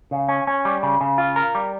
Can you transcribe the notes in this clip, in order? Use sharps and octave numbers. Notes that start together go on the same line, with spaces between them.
C#3
C#4
C#4
G3
C#3
C#3
F4
A#4
G3